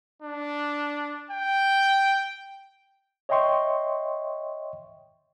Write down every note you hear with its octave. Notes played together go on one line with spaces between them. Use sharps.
D4
G5
C#5 D#5 E5 G5 C6 C#6